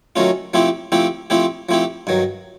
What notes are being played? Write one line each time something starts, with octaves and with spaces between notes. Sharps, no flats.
D#3 F#3 A3 C#4 F4
F3 A3 C4 E4 G4
F3 A3 C4 E4 G4
F3 A3 C4 E4 G4
F3 A3 C4 E4 G4
G2 D#3 F#3